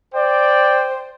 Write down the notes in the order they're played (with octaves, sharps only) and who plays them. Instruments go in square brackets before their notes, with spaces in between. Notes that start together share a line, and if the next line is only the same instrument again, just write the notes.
[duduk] C5 [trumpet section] D5 G5